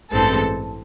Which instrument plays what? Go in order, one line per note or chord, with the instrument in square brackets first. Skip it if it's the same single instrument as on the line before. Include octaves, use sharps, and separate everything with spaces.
[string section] A1 G2 E3 G#3 C4 A4